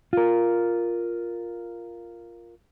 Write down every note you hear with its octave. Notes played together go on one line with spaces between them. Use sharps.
F4 A#4